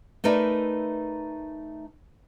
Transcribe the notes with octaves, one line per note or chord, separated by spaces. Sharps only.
A3 D#4 A#4 B4 D5 E5